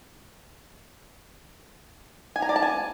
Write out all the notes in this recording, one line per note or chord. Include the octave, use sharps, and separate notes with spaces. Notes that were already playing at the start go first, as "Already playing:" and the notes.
G#5
A#5
D5
A5
G#5